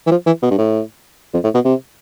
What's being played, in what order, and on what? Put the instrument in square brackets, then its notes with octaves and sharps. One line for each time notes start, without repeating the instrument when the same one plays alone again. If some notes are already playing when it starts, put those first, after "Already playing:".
[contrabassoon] E3
F3
E3
B2
G2
A2
F2
A2
B2
C3